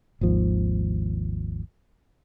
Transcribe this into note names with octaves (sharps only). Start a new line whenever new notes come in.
G#1 D#2 F3